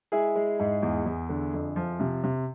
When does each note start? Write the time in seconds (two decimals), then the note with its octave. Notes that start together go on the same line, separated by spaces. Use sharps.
0.12 G#3 E4 G#4
0.36 G#3
0.60 G#2
0.82 E2
1.06 E2
1.29 D3
1.54 F2
1.76 F3
2.00 C3
2.24 C3